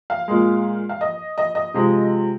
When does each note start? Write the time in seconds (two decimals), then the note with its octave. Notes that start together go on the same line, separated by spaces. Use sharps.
0.10 F5
0.28 A#2 G#3
0.89 F5
1.01 D#5
1.38 D#5
1.55 D#5
1.74 C3 F3 G#3